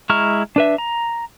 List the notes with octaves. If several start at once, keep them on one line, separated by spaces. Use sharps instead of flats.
G#3 E4 A#5 C#6 F6
D4 B4 E5
A#5